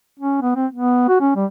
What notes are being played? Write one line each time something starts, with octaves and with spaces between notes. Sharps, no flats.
C#4
B3
C4
B3
F#4
C#4
G3